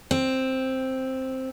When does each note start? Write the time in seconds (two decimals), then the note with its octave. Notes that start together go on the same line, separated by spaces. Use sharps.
0.11 C4